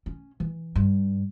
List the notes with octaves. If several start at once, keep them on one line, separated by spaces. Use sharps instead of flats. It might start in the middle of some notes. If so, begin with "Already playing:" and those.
C#4
E3
G2